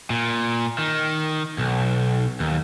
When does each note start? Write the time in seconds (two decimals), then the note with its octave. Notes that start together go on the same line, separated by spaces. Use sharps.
0.10 A#2
0.78 D#3
1.58 B1
2.40 D#2